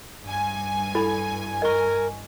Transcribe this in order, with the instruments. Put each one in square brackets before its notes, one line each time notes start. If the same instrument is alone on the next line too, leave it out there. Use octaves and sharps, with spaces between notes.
[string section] G2 G#5
[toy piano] E4 A4 B5
[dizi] A#4 [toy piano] D#5 C#6